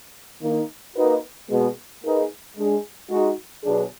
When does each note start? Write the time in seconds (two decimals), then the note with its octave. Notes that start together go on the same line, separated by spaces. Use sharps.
0.42 D#3 A#3 D#4
0.96 A#3 D#4 F#4 B4
1.50 B2 G#3 B3
2.04 A#3 D#4 G#4 B4
2.57 G#3 D4 G#4
3.10 G#3 D#4 F#4
3.64 B2 F#3 D4 G#4